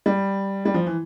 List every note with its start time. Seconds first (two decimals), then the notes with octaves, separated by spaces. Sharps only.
0.06 G3
0.65 G3
0.74 F3
0.86 E3